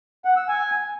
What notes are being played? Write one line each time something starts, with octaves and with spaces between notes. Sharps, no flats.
F#5
E6
G#5